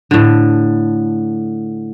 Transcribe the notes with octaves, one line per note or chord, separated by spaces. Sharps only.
A2 D3